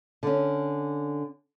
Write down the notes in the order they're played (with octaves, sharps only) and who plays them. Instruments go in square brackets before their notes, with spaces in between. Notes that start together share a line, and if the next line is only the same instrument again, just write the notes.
[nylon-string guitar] D3 C#4